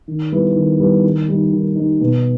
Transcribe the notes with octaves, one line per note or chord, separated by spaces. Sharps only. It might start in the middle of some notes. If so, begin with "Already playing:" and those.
D#3
G3 B3 E4
D#3
G3 B3 E4
D#3
G3 D#4
D#3
G3 D#4
B2